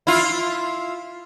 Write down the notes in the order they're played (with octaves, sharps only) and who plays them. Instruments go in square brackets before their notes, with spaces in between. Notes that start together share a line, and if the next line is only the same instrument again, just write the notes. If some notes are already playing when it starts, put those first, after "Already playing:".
[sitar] E4 F4